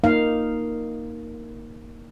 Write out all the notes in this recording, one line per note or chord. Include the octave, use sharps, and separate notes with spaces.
A#3 D#4 F5